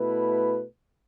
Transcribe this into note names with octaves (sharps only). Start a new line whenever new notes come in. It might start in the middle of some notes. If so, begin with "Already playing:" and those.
Already playing: B2 A3 E4 B4